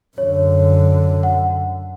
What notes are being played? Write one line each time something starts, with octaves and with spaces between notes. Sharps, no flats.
F#2 D3 C#5
F#5